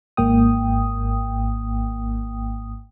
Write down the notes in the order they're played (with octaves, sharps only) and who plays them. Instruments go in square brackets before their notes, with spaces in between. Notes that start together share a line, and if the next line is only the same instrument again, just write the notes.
[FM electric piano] G#1 G#2 A#3 G5 D#6